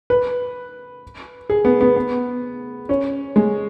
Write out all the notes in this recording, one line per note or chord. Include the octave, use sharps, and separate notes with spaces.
B4
G#4
B3
B3
B3
C#4
G#3